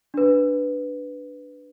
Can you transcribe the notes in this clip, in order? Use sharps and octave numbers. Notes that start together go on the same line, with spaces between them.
D4 B4